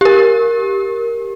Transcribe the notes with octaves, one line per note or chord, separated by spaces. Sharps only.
G4 A#4